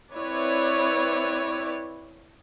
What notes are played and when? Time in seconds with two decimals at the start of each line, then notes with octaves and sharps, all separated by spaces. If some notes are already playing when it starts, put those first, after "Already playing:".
0.13 C4 E4 B4 C#5 D5